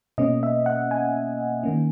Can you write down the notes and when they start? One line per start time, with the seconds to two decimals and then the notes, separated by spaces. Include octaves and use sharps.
0.18 B2 A#3 C#4 D#5
0.43 E5
0.66 F#5
0.91 G#5
1.63 D#3 A#3 C#4